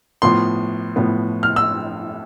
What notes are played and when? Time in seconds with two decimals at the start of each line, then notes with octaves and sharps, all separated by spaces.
0.22 A2 F3 B3 C6
0.96 A2 F3 B3
1.43 F6
1.56 E6